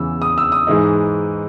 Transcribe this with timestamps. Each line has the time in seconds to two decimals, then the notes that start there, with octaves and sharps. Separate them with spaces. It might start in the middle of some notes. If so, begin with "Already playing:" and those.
Already playing: E2 C#3 E3 B3 E6
0.22 D#6
0.38 E6
0.52 D#6
0.67 G#2 E3 G#3 D#4